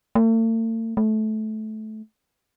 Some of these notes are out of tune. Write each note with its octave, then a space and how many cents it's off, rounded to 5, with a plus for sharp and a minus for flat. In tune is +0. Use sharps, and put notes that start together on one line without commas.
A3 +45
A3 -20